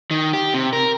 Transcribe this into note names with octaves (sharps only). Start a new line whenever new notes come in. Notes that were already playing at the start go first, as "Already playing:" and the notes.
D#3
G4
C3
A#4